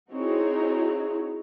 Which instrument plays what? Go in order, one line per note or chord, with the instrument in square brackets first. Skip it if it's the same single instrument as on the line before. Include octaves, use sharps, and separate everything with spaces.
[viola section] C4 D#4 E4 F#4 G#4 C#5